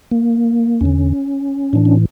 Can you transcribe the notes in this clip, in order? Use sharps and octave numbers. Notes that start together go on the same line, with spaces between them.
A#3
E2 D3 C#4
A2 E3 D4
C#4